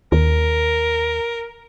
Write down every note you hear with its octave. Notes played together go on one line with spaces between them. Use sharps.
D#2 A#4